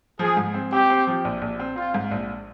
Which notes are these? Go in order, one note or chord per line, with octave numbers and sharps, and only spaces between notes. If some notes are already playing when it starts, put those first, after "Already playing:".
F3 G#4
G#2
C4
C4 G4
C4
F3
A#1
A#1
C4
C4 F4
G#2
A#1